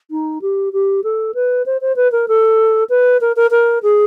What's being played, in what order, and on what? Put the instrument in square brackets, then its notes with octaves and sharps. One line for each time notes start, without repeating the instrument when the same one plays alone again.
[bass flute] D#4
G4
G4
A4
B4
C5
C5
B4
A#4
A4
B4
A#4
A#4
A#4
G#4